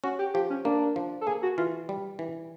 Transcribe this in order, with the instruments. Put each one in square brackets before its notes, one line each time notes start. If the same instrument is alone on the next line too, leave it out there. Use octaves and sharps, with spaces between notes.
[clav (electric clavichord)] C#4 [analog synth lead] F#4
[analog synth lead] G4
[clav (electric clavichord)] F3 [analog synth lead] G4
[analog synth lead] C#4
[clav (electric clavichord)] A#3 [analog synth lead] D4
[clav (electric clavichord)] F3
[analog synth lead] A4
[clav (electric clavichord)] A#3 [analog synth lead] G#4
[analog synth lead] F#4
[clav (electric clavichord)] E3 [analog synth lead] F4
[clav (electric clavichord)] G3
E3